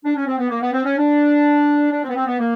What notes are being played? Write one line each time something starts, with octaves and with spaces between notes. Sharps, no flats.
D4
C#4
C4
B3
A#3
B3
C4
C#4
D4
D4
C4
B3
C4
B3
A#3